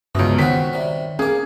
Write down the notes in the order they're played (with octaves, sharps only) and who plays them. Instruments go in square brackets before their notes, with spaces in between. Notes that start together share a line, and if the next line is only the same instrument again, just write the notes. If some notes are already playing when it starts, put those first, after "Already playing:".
[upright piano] C#2 B2 [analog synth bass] G2 [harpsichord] C#4 E4
[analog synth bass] D#3 [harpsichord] C4 C#4 F#4 [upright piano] B6
[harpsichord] C3 G3
[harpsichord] A#3 D6 [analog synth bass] C#4 [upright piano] G#4